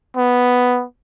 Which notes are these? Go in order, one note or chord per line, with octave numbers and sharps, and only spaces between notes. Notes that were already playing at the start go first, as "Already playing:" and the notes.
B3